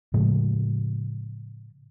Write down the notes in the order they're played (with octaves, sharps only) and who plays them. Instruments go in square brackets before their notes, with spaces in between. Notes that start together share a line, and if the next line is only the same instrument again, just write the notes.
[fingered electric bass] A2 C#3 F3 G#3